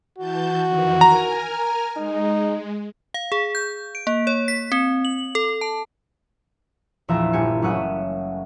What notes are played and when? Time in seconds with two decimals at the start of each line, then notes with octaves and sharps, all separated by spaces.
0.18 E3 F#4 A5 G6
0.66 F2 D#3 E3
1.01 A#4 G#5 A#5 F6
1.97 G#3 D#4
3.14 F5
3.32 G#4
3.55 G6
3.95 D7
4.07 A#3
4.27 C#5
4.48 B6
4.72 C4
5.05 F#7
5.35 A4
5.61 A5
7.08 A#1 E2 F3 C5 E5 A#5
7.33 G1 A#2 G4 G#5 C#7
7.62 F#1 A3 C#4 E5 F#5 D#6